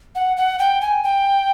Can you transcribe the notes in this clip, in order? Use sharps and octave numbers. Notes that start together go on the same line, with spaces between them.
F#5
F#5
G5
G#5
G5